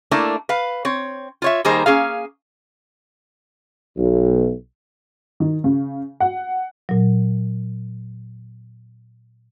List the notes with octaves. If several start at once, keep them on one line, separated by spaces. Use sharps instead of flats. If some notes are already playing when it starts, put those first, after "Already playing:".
A3 A#3 D4 E4
B4 F5
C4 C#5
F4 C#5 E5
D#3 G3 A#3 D#4 G#4 C5
A#3 C#4 G#4 F5
B1
D#3
C#3
F#5
A#2 F#3